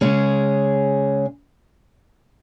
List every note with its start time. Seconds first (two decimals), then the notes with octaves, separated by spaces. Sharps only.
0.01 C#3 G#3 C#4 G#4